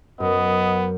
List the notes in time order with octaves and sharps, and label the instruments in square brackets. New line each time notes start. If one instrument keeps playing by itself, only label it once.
[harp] F#2 [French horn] B3 [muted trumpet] D#5